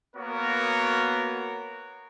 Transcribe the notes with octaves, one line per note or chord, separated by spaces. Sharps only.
A#3 B3 F#4 A#4 C#5